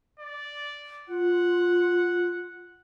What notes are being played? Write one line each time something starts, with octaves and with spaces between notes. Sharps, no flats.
D5
F4 F#5